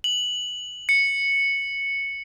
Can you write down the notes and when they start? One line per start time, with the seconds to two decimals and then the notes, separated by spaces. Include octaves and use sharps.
0.04 F#7
0.89 C#7